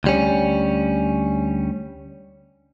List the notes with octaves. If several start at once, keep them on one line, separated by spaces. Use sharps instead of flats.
D2 G3 C#4